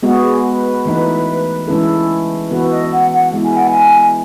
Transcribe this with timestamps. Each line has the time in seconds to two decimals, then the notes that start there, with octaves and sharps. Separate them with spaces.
0.03 G#3 B3 F#4 G#4
0.44 B4
0.85 E3 A3 D#4
1.67 E3 G#3 C#4 E4 A4
2.50 E3 B3 F#4 A4 B4
2.71 D#5
2.92 F#5
3.12 F#5
3.33 G#3 B3 E4
3.44 G#5
3.56 F#5
3.67 G#5